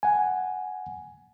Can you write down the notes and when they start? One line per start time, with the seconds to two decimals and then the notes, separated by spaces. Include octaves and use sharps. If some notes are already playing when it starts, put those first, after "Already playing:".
0.03 F#5 G#5